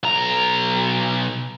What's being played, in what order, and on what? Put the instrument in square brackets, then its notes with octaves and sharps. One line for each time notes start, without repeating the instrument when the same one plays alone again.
[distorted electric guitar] B1 A#5